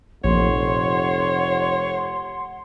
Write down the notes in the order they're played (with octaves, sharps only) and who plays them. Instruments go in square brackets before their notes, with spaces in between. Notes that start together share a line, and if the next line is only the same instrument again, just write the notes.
[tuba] F1 [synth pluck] A#1 [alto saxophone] C#5 [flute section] F#5 C6